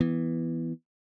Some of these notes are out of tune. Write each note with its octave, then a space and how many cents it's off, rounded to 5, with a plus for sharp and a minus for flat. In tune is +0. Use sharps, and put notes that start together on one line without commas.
E3 +0 B3 +0